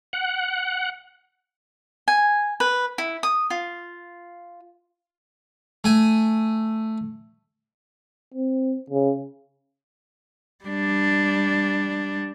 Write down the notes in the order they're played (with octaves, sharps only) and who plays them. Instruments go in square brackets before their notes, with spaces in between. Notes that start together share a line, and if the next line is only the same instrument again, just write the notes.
[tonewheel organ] F#5
[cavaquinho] G#5
B4
E4
D#6
F4
[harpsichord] A3 G#5
[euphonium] C4
C#3
[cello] G3 D4